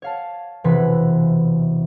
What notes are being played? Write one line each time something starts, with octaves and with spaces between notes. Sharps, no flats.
C#5 F5 A5
E1 C3 E3 B4 B5